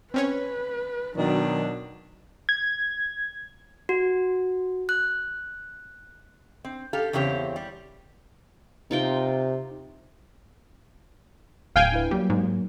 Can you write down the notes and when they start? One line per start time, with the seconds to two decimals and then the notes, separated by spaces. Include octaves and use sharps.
0.14 C4 C#4 B4 C#5
1.16 B2 D#3 F#3 D4
2.49 G#6
3.89 F#4
4.89 F#6
6.65 C4
6.93 G4 A4 F5
7.13 E2 C#3 C4 G4 C#5
7.56 G3
8.91 C3 D#4 F4 G5
11.76 D1 F5 G5 G#5
11.92 D4 E4 B4
12.11 F#3 G3 A#3
12.30 G#2